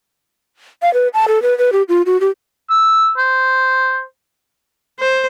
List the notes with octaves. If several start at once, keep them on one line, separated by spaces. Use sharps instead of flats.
F5
B4
A5
A4
B4
B4
G4
F4
F#4
G4
E6
C5
C5